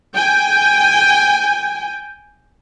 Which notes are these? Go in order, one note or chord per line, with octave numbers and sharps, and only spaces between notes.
G5 G#5